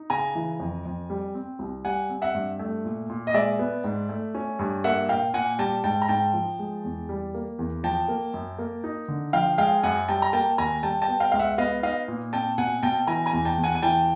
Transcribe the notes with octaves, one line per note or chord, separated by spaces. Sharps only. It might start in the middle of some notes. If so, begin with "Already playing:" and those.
Already playing: D#4
C#3 G#5 A#5
E3
F2
F2
G3
C4
C2
G3 F#5 G#5
C4
E5 F#5
G2
A3
A#2
A#2
D#5
G#3 D5 E5
B3
G#2
A3
C#4
G2
A#3 E5 F#5
A#2 F5 G5
A#2 F#5 G#5
G3 G5 A5
G#2 G5 A5
A#5
G#2 G5 A5
F3
G#3
E2
G3
A#3
E2
F3 G5 A5
A#3
F#2
A#3
D#4
D3
F3 F5 G5
G#3 F5 G5
F#2 F#5 G#5
G3 G5 A5
A#5
A#3 G5 A5
D#2 G#5 A#5
G3 G5 A5
G5 A5
B3
F5 G5
C#2 F5
E5 F#5
B3 D#5 F5
D#4 D#5 F5
A#2
C4 G5 A5
B2 F#5 G#5
B2 G5 A5
E3 G#5 A#5
G#5 A#5
E2
G5 A5
E2
F#5 G#5
G#5
E3 G5 A5